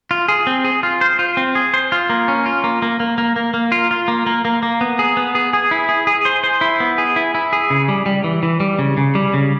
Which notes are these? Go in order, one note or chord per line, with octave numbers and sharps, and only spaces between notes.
F4
G#4
C4
G#4
F4
C5
F4
C4
G#4
C5
F4
A#3
C#4
F4
A#3
A#3
A#3
A#3
A#3
A#3
F4
F4
A#3
A#3
A#3
A#3
B3
G#4
B3
G#4
G#4
E4
G#4
G#4
C5
C5
E4
B3
G#4
E4
E4
G#4
C#3
G3
G3
E3
E3
G3
C#3
C#3
G3
C#3